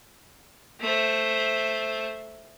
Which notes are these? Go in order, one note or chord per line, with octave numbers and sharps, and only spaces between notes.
A3 C5